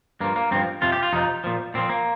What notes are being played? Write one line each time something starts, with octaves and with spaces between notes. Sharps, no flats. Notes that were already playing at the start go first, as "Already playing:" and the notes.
G2 F3 A#3
A#3
G2 F3 C4
F2 C3 F3 F4
G4
F4
F2 C3 F3 D#4
A#2 F3
A#2 F3 C4
A#3